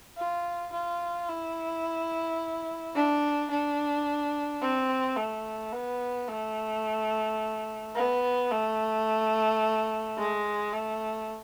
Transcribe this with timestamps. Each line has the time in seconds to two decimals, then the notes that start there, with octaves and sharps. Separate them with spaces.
0.17 F4
0.72 F4
1.29 E4
2.95 D4
3.50 D4
4.62 C4
5.16 A3
5.73 B3
6.28 A3
7.95 B3
8.51 A3
10.17 G#3
10.72 A3